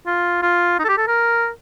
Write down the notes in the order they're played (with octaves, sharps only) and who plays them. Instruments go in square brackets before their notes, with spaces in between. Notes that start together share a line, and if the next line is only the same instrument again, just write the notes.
[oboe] F4
F4
D#4
A4
G4
A4
A#4